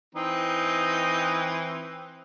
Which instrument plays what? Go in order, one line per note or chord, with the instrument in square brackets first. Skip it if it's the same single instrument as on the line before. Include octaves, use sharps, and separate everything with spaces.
[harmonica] E3 C4 D#4